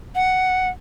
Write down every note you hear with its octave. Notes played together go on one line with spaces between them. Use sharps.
F#5